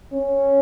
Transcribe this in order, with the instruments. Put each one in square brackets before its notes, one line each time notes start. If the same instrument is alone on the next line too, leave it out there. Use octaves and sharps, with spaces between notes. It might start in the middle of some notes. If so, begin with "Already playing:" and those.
[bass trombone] C#4